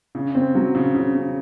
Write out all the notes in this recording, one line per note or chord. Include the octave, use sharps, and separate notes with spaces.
C#3
C4
F#3
C#3
C#3
C#3